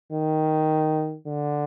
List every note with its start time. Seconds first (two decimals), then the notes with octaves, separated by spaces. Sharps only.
0.12 D#3
1.27 D3